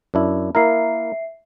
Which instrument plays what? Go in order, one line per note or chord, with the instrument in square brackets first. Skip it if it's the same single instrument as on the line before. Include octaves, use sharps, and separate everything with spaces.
[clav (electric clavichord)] F#2 D4 E4
[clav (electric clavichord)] A#3 E4 A#4 [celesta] E5 C7